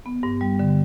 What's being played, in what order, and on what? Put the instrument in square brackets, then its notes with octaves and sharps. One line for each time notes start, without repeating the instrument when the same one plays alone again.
[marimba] B3
G2
G3
D3